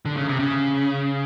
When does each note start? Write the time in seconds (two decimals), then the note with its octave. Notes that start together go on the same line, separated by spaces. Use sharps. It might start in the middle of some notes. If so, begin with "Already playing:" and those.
0.05 D3
0.17 C#3
0.28 C3
0.39 C#3